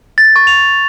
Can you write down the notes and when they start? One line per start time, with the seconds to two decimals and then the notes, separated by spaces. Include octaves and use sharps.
0.18 A6
0.36 C#6
0.47 F7